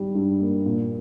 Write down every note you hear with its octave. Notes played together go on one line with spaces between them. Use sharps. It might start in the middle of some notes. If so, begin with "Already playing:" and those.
Already playing: G#1 G3
G2
A#3
A#2